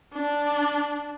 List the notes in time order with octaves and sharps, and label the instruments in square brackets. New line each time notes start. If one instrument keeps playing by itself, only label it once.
[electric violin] D4